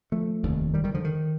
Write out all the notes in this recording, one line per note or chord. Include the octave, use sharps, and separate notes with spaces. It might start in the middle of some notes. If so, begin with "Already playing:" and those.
F3 A3
F1 D#2 D3
D#3 G3
D#3 G3
D3 F3
D#3